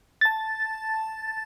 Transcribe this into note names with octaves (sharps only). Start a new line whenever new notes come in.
A5 A6